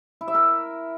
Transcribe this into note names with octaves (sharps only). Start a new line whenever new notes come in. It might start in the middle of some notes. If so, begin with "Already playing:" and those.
E4
E5
A#4